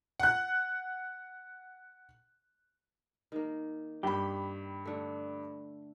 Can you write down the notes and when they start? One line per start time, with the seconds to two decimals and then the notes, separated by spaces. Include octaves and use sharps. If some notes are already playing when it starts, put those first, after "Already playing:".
0.20 F#5 F#6
3.32 D#3 A#3
4.03 G2 G4 B5
4.85 D3 A3